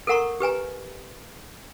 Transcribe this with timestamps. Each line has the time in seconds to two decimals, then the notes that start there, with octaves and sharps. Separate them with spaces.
0.07 A4 A#4 F#5 A#5 C#6
0.40 G4 B4 G#5 A#5